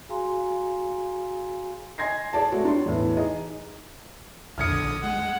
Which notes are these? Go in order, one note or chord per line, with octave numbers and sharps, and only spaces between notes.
F#4 G#4 F5 G#5 A#5 C6
D#5 G#5 C6 G#6 A#6 C7
G#4 C#5 D5 A5
G#3 A3 C4 F#4
D4 G4 C#5 C6
E2 A2 E3
D#4 G#4 D#5
A#1 D3 D#6 F6 G#6 C#7
G#3 F#5